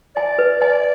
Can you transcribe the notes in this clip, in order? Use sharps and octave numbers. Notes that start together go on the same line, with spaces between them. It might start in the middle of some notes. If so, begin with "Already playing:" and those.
D5 G#5
B4
D5 G#5